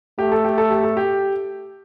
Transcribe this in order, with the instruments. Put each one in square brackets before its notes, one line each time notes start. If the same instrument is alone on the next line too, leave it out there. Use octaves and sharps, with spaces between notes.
[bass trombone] A3 [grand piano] G4
[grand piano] A4
G4
A4
G4
A4
G4